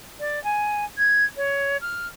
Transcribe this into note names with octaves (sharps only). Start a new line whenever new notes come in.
D5
G#5
G#6
C#5
F6